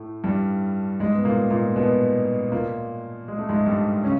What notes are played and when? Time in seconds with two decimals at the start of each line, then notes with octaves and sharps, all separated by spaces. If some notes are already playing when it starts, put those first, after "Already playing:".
Already playing: A2 A3
0.24 G2 G3
1.00 G#2 G#3
1.14 B3
1.25 A#2 A#3
1.50 A#2 A#3
1.76 B2 B3
2.52 A#2 A#3
3.28 G#3
3.39 A3
3.49 G#2 G#3
3.66 G2 G3
4.04 C#3 C#4